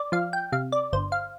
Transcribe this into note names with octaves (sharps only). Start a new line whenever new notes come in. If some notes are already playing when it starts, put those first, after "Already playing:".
Already playing: D5
F3 F5
G5
C3 F5
D5
G1 C5
F5